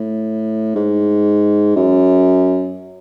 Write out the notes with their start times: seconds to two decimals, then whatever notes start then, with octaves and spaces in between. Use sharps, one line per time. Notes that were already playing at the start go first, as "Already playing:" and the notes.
Already playing: A2
0.75 G#2
1.76 F#2